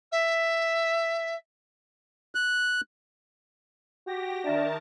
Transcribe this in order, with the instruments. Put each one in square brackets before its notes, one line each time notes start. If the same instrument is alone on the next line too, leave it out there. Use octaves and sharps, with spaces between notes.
[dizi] E5
[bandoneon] F#6
[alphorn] F#4 [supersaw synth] G4 A#6
[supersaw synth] D#3 A#4 A5 [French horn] D4 [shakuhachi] E5